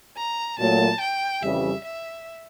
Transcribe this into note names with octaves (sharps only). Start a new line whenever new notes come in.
A#5
A#2 F#3 A3 A5
G5
F2 C#3 E3 G3 E5
E5